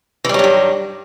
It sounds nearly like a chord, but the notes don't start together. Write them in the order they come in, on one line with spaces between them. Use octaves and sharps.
E3 G3 F#3 G2 D#3